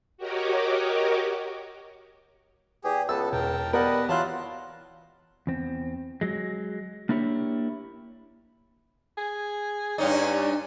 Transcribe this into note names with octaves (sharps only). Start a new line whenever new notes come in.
F#4 G4 A#4 C#5 D#5 D6
E2 G4 G#4
C#2 B3 A4 A5 E6
E2 B2 A#4 G5 A5
G3 B3 A#4 B4 D#5 F#5 A5
E3 F#3 E4 F4 A5 C6 F6 F#6
E2 C4
F#3 G#3
A#3 D4 E4 G4 C#5
G#4
G2 C#4 D#4 D5